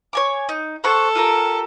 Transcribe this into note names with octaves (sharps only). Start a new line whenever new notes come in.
C#5 G#5 D6
D#4
A4 C5 F#5 C#6
F4 G4 A#4